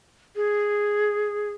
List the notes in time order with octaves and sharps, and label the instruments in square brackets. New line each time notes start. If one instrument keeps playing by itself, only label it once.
[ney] G#4